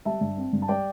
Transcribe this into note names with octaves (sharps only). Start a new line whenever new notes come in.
G3 E5 A5
G2
C4
G2
A5
G3 D5 G5